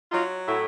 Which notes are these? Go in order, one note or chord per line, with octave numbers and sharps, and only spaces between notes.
F#3 D#4 F4
A2 E4 F#4